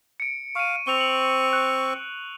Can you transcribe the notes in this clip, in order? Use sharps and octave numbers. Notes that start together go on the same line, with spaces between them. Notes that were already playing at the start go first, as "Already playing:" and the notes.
C#7 D7
F5 C#6 D#7
C4 C#6 E6 F7 G7
F#7
F#6 F7